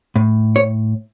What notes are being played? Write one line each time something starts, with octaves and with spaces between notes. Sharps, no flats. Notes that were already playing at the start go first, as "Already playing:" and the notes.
A2
C#5